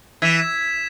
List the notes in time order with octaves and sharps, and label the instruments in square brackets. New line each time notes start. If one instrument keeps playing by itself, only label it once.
[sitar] E3 [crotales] G#6 B6 E7